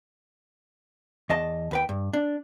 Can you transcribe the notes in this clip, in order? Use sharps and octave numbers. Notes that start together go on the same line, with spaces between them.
E2 D#5 A5
D#2 B4 G5
G2
D4